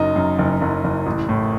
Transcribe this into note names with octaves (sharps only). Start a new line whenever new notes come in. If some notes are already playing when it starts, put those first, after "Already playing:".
Already playing: F#1 F#2 D#4
F#2
F#1
F#1
F#1
A1
A2